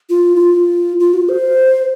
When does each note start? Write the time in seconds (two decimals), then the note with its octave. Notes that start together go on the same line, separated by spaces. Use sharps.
0.10 F4
0.36 E4
0.39 F4
1.00 F4
1.14 F#4
1.29 C5